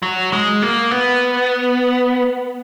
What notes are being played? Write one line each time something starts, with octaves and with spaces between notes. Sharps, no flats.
F#3
G#3
A#3
B3